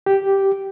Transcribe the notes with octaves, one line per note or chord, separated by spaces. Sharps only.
G4